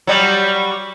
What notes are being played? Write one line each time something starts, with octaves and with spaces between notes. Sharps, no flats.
F#3 G3